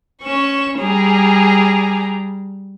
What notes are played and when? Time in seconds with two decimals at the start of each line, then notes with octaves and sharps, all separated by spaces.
0.23 C#4 C#6 E7
0.79 G3 G#4 A#5